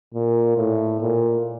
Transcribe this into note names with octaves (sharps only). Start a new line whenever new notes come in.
A#2
A2
A#2